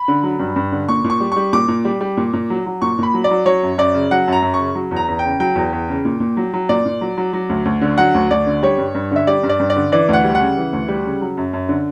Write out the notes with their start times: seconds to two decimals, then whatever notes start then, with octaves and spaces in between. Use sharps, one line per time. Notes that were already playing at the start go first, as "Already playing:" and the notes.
Already playing: B5
0.08 D3
0.23 F#3
0.40 G2
0.56 G2
0.72 D3
0.89 A#2 C#6
1.04 A#2
1.10 C#6
1.20 G3
1.32 G3 C#6
1.53 A#2 D6
1.68 A#2
1.85 G3
2.01 G3
2.17 A#2
2.33 A#2
2.50 F#3
2.66 F#3
2.82 A#2 C#6
2.99 A#2 B5
3.14 F#3
3.24 D5
3.31 F#3
3.46 F#3 C#5
3.63 F#2
3.78 F#2 D5
3.94 C#3
4.11 F#3 F#5
4.28 F#2 A#5
4.43 F#2
4.54 C#3 C#6
4.75 F#3
4.91 E2
4.96 A#5
5.08 E2
5.19 G5
5.24 C#3
5.40 F#3 G5
5.56 E2
5.73 E2
5.88 C#3
6.05 A#2
6.20 A#2
6.37 F#3
6.54 F#3
6.69 A#2 D5
6.86 A#2
7.01 F#3
7.18 F#3
7.33 F#3
7.49 D2
7.65 D2
7.81 D3
7.98 F#3 F#5
8.14 D2
8.31 D2 D5
8.47 D3
8.63 G3 C#5
8.78 G2
8.95 G2
9.11 D3 E5
9.27 G3 D5
9.43 G2
9.49 D5
9.60 G2
9.70 D5
9.76 D3
9.92 E3 D5
10.09 D2 F#5
10.24 G3
10.35 C#3 F#5
10.57 E3
10.73 D2
10.88 G3
11.05 C#3
11.22 F#3
11.37 F#2
11.53 F#2
11.69 D3